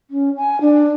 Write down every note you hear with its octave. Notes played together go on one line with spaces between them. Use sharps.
C#4
G#5
D4